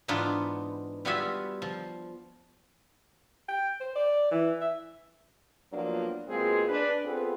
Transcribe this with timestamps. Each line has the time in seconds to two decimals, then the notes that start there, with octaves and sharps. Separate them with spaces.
0.08 G#2 E3 B3 D4 D#4 F4
1.05 G3 B3 F4 F#4 G#4 E5
1.62 F3
3.48 G5
3.80 C5
3.95 D5
4.31 E3
4.61 E5
5.72 F3 F#3 A#3 B3 D4 F4
6.27 B2 G#3 A#3 C4 F4 G#4
6.69 D4 B4
7.04 B3 C4 F4 G#4 A4 B4